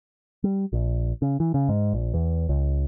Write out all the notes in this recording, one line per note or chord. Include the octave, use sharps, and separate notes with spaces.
G3
A#1
C#3
E3
C#3
G#2
A#1
E2
C#2